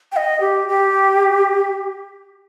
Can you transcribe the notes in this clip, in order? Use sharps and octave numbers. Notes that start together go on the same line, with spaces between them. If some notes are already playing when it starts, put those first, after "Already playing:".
G5
D#5
G4
G4